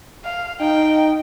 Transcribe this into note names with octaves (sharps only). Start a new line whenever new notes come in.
F5
D#4 G5